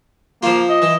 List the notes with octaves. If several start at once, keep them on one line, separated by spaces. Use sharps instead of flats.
F3 A#3 F4
D#5
E3